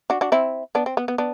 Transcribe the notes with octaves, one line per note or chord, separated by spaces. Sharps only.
D4 F#4
D4 F#4
C4 E4
B3 D4
C4
B3
B3
B3 D4